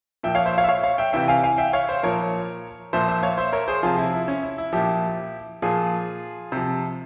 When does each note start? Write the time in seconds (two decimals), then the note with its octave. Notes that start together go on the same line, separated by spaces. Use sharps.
0.23 A#2 F3 E5 G5
0.35 C#5 F5
0.46 C5 E5
0.58 C#5 F5
0.64 E5
0.69 C#5 F5
0.84 C#5 F5
0.98 E5 G5
1.13 C3 E3 E5 G5
1.28 F5 G#5
1.44 F5 G#5
1.58 E5 G5
1.73 C#5 F5
1.89 C5 E5
2.03 A#2 F3 A#4 C#5
2.93 A#2 F3 C5 E5
3.08 C5 E5
3.23 C#5 F5
3.38 C5 E5
3.53 A#4 C#5
3.68 G#4 C5
3.83 C3 F3 F4 G#4
3.98 E4
4.13 E4
4.28 C#4
4.43 E4
4.58 E4
4.73 A#2 F3 E4 G4
5.62 A#2 F3 F4 G#4
6.52 C3 F3